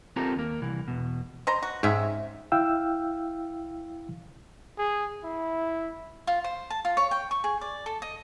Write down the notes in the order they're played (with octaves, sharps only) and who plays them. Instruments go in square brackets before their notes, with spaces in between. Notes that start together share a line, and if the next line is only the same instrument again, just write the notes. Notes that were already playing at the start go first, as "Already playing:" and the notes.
[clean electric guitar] C4 F4 G4 A4 A#4 A#5
D#2 A#3
C2 E3
E2 B2
[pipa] B2 C5 A#5
F#4
[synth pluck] G#2 [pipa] C3 C#4 E5
[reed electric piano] E4 F5 G5 E6
[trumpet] G#4
E4
[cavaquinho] F4
C5
A5
F4
C#5
G5
C#6
G#4
D5
A4
D#5